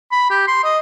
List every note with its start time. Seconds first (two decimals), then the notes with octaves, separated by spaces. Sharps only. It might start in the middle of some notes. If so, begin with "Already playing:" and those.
0.12 B5
0.30 G4
0.48 C6
0.64 D#5